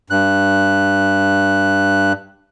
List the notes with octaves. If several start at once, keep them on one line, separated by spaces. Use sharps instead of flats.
G2 F#6